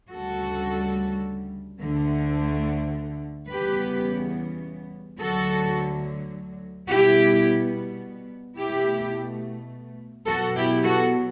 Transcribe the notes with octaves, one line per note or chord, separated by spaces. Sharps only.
D2 C#3 G3 F#4 A4
D2 D3 A3
E2 C#3 G3 B3 G4 B4
D2 D3 F#3 F#4 A4
B2 G3 B3 E4 G4
B2 A3 E4 G4
B2 F#3 B3 F#4 A4
E4 G4
F#4 A4